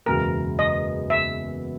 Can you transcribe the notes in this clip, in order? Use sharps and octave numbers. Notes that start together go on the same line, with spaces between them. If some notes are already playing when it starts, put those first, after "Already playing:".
F#1 E2 B2 G#3 A#4
D#5
E5